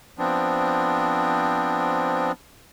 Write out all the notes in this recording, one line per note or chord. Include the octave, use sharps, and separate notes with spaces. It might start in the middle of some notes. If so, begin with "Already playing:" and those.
F3 B3 C4 D4